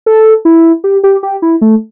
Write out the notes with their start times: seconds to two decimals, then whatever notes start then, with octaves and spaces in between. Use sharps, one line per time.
0.06 A4
0.45 E4
0.84 G4
1.03 G4
1.23 G4
1.42 E4
1.61 A3